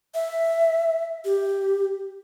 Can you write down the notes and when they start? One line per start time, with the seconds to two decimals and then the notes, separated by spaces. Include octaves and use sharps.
0.14 E5
1.25 G4